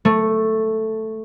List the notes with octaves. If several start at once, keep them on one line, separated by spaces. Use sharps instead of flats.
A3